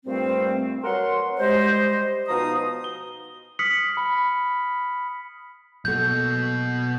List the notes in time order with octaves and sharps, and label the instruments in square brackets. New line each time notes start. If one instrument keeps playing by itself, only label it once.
[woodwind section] G2 A#2 G3 A3 C4
F#3 A#4 B4 F#5 C6
G3 G#3 C5 D#5
B2 F3 D#4 F5 A#5 D#6
[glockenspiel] G7
D#6 F6 B6 C#7 F#7
B5
[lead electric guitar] B2 F#4 [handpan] F#3 A#3 A4 [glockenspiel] G6